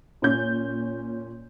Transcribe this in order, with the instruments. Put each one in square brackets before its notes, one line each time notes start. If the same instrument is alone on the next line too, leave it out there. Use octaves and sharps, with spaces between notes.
[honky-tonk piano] A#2 C#4 G6